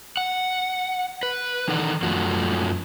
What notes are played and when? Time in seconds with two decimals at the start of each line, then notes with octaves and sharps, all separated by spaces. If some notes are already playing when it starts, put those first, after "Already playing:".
0.17 F#5
1.23 B4
1.68 D#3 E3 D#4 A4 A#4 F#5
2.02 F#2 F3 A3 F#4